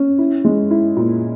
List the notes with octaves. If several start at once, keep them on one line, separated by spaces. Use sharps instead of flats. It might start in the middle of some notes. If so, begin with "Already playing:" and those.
Already playing: C#4
E4
G#3
E4
A#2